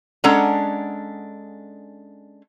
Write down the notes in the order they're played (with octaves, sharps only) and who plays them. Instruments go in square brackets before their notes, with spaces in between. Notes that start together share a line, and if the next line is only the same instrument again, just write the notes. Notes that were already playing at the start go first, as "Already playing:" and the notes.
[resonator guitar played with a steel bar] G#3 C#4 D4 A4 F#5 A#5